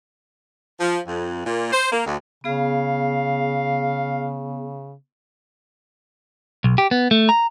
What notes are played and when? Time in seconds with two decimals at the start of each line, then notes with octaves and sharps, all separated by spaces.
0.80 F3
1.07 F2
1.46 A#2
1.73 C5
1.92 A#3
2.05 D2
2.44 C#3 B3 G#4 F5
6.64 B1
6.78 G4
6.91 B3
7.11 A3
7.29 A#5